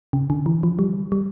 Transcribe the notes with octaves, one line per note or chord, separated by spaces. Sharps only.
C#3
D3
E3
F3
G3
G3